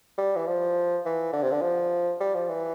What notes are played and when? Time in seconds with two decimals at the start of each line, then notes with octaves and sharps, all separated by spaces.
0.18 G3
0.36 E3
0.46 F3
1.05 E3
1.33 D3
1.43 C3
1.51 D3
1.62 F3
2.20 G3
2.34 F3
2.49 E3